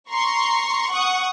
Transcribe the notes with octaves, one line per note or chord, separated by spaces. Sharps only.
A#5 C6 C#6
F#5 C#6 D#6